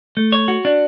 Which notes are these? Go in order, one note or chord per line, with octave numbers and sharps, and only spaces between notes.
A3
C#5
F#4
D4